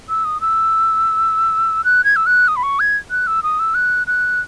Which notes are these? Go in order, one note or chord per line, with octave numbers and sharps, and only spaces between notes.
E6
D#6
E6
F#6
G#6
E6
F#6
D#6
B5
C#6
G#6
F#6
E6
D#6
E6
F#6
F#6